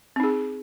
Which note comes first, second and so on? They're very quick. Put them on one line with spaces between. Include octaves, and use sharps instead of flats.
C4 D#4 G#4